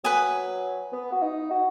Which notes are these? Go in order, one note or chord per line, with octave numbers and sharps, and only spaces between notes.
F#3 B4 G#5 D#6
B3
F#4
D#4
F#4